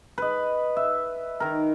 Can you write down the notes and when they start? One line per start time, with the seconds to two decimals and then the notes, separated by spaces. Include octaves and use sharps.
0.18 B4 D#5
0.76 E5
1.40 D#3 A#4